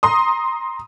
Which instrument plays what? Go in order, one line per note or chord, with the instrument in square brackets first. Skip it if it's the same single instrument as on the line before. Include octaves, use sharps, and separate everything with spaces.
[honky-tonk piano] A#5 C6 D#6